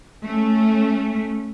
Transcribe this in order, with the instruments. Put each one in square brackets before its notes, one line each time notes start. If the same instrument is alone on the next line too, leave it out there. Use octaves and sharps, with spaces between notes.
[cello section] A3 C#4